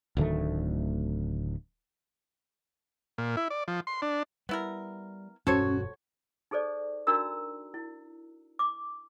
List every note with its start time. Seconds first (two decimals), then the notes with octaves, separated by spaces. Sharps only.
0.17 D1 D2 D#3 A3
3.18 A#2
3.37 E4
3.50 D5
3.68 F3
3.87 C6
4.02 D4
4.49 G3 B3 E4 A#4
5.47 E1 G2 B2 C#4 F#4 A4 C5 C#5
6.51 D#4 G#4 A4 C5 D5
7.07 D4 D#4 F#4 A#4 A#5 E6
7.74 E4
8.59 D6